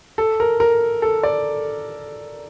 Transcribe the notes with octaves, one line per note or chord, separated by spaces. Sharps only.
A4
A#4
A#4
A4
D5